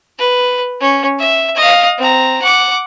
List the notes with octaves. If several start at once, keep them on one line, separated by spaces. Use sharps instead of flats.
B4
C#4
E5
D#5 F5
C4 A#5
F#5 D6